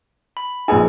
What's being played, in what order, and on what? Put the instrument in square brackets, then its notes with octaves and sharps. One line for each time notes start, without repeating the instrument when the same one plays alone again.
[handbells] B5
[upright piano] A#1 G#5 [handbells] D#4 G#4 B4